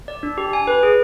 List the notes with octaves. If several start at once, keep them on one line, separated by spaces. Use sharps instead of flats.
D5
D4
G4
G#5
B4
G#4